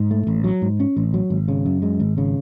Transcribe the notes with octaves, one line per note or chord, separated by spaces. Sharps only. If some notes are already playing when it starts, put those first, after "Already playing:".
Already playing: G#2
A3
A1
F#3
G#2
C#4
A1
F#3
G#1
C#3
F#2
G#3
G#1
C#3